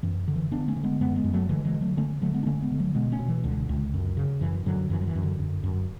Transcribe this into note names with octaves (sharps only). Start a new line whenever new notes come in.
F#2 E3
D3
E3
D3 B3 D4
A3 C#4
D3
G#3 B3
F#2 G#3 B3
G#3 B3
F#2
F#3 A3
D3 E3 G#3
E3 G#3
D3
F#3 A3
D3 A3 C#4
D3 F#3 A3
G#3 B3
D4
D3 A3 C#4
G#3 B3
D3
F#3 A3
B2 G#3 B3
A3 C#4
B2
E3
C#2 D3
C#2
F#2
C#3
F#2 E3
F#2 D3 F#3
F#2 E3
F#3
E3
F#2
D3
F#2
F#2